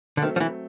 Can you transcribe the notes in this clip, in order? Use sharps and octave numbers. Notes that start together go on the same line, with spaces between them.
D3
D#3 F#3 A3 C4
F3
E3